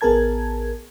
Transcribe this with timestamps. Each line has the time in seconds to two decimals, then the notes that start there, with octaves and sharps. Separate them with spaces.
0.01 A1 B3 G#4 A#4 A5 G#6